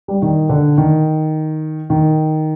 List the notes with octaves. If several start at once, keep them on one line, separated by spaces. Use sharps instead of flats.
G3
D#3
D3
D#3
D#3